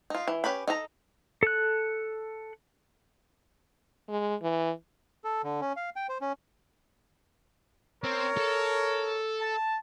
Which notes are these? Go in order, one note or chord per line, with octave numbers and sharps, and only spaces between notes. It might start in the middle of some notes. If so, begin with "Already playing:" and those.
D#4 F4
E3
C#4 G4 B4 B5
D#4 A4 A#5
A4 F#6
G#3
E3
A4
D3
C#4
F5
G5
C5
C#4
C4 A#4 C#5
A4
A5